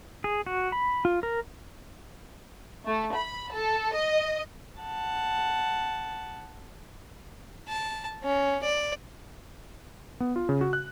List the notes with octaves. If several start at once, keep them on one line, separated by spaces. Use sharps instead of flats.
G#4
F#4
B5
F4
A#4
A3
B5
A4
D#5
F#5 A5
A5
C#4
D5
B3
F4
C#3
F#4
F#6